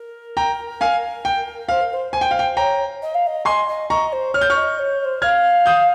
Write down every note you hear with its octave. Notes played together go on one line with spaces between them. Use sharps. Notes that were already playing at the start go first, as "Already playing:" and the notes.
Already playing: A#4
G5 A#5
F5 G#5
G5
C5 F5
A#4
C5
C5 G#5
G5
F5
G5
C#5 G5 A#5
D#5
F5
D#5
D#5 G#5 C6
D#5
D#5 A#5 C#6
C5
C#5 F6
G6
C#6 F6
D#5
C#5
C#5
C5
F5 F6 G#6
D#6 G6